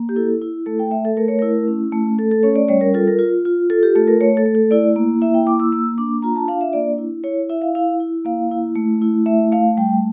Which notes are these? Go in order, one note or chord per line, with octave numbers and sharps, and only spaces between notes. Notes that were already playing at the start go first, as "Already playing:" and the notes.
Already playing: A#3
G4
E4 A4
E4
A3 A4
G5
A3 E5
A4
A3 A#4
C#5
E4 A#4
C#4
A3
A3 A4
A4
C#4 C#5
D5
G3 C#5
A#4
F4 A4
A#4
F4
F4
F4 A4
G4
A3 A4
A#4
A3 C#5
A4
A3
A4
E4 D5
A#3
E4 E5
G5
A#3 D6
E6
A#3 E6
D4 D6
F4 A#5
A5
D4 F5
E5
A#3 D5
E4
E4 C#5
E4 E5
F5
E4 F5
E4
A#3 F5
E4
A3
E4
A3 E5
A3 F5
G3 G5